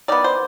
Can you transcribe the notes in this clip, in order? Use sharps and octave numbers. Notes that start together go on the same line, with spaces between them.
D#3 B3 D5
C5